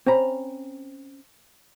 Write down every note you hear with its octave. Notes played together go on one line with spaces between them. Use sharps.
C4 C#4 A#5 B5